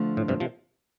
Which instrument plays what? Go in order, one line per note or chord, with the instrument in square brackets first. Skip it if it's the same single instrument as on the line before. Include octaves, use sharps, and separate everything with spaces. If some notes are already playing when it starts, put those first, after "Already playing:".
Already playing: [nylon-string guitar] D3 F3 A3
[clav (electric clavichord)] A2
G2 C3
C3 F3